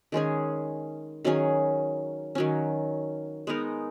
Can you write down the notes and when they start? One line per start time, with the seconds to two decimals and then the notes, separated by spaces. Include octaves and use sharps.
0.12 D#3 G#3 C#4 G#4
1.25 D#3 F#3 C#4 G#4
2.35 D#3 F#3 C#4
3.47 G#3 B3 D#4 A#4